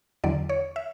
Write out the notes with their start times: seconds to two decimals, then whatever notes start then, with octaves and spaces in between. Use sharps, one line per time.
0.24 E2 D3 F#3 D5
0.49 C#5
0.76 E5